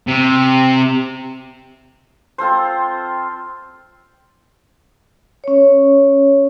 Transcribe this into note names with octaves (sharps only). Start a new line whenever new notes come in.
C3
C4 F4 A4 C5
C#4 C#5